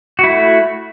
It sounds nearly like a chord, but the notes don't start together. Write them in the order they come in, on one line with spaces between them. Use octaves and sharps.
F#4 E4 A3